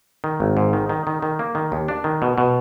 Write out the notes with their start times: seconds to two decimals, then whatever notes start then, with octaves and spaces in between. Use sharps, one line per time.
0.24 D#3
0.40 G#1
0.57 G#2
0.73 D#3
0.89 D#3
1.07 D#3
1.22 D#3
1.39 A#3
1.55 D#3
1.72 D#2
1.88 D4
2.04 D#3
2.22 B2
2.38 B2